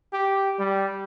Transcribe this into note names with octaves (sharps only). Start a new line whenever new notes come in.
G4
G3